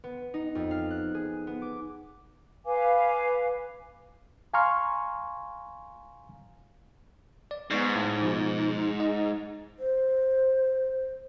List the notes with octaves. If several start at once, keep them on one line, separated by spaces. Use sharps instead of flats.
B3
D#4
F2
F5
F#6
G#4
B3
D6
B4 F5 G#5 D6
F5 G#5 A#5 C6 C#6 F6
D5
G#2 B3 C#6 C7
A2
B2 F3
D#5
C5